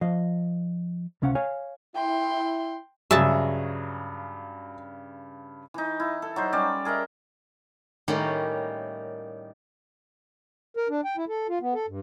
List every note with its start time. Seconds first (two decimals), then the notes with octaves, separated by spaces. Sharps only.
0.01 F3 D#5 F5
1.22 C#2 C3 C#4 F5 F#5
1.35 C#5 F5 G#5
1.95 E4 G5 C6
3.11 G2 C#3 F#3 F#4 G#4 E5 A5
5.74 E3 D#4
6.00 E4
6.22 A4
6.36 F#3 D#4 C5
6.53 G3 C#4 D5
6.85 G#4 A#4 D#5 E5
8.08 A2 D#3 G3 A#3 C#4 E4
10.77 A#4
10.89 D4
11.05 G5
11.17 E4
11.29 A4
11.49 F4
11.61 B3
11.74 A4
11.88 G2